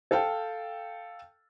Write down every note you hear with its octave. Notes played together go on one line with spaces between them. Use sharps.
A4 F5 G5